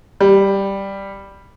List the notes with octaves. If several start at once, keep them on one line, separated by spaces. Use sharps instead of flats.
G3